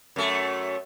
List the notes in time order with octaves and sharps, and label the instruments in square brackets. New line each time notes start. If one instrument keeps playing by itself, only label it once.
[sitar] F#2 A3